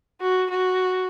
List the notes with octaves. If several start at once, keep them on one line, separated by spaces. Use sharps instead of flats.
F#4
F#4